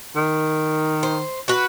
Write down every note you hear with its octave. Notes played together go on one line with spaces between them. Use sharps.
D#3
C5
F#4 B4